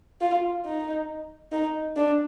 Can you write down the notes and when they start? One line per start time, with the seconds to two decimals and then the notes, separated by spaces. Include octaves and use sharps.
0.21 F4
0.66 D#4
1.52 D#4
1.96 D4